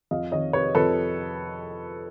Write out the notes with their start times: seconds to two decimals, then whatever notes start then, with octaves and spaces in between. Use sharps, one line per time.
0.11 F2 D#5 F5
0.32 D#3 C#5 D#5
0.53 C3 B4 C#5
0.75 F2 A4 B4